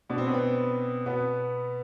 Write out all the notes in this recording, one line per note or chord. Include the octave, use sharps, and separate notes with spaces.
B2 D4
C4
B3
C4
B2 B3